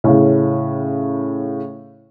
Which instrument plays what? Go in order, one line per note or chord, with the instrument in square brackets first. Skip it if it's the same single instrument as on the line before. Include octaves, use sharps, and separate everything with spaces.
[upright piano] A2 C#3